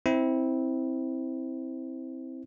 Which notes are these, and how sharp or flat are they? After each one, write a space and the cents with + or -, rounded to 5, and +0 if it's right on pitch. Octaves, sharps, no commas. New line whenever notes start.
C4 +0 E4 -20